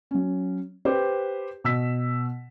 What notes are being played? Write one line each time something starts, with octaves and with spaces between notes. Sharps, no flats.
F#3 C#4
G4 B4 C5
B2 E6 B6